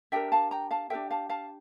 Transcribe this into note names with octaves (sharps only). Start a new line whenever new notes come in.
D4 G4 A#4 E5 G5
F5 A5
G5 A#5
F5 A5
D4 G4 A#4 E5 G5
F5 A5
F5 A5